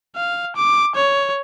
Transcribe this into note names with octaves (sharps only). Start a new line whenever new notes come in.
F5
D6
C#5